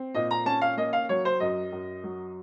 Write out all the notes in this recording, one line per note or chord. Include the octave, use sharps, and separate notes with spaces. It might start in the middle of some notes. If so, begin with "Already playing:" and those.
Already playing: C4
A#2 D#5
A#5
C#4 A5
F5
A#3 D#5
F5
F#3 C#5
C5
F#2 D#5
F#2
F#3